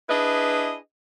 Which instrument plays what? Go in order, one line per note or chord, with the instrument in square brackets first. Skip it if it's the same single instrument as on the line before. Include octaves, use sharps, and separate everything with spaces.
[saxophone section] D4 E4 G#4 B4 D#5